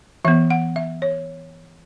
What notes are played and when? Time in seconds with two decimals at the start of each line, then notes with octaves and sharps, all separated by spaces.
0.25 E3 B3 E5
0.50 F#5
0.76 E5
1.02 C#5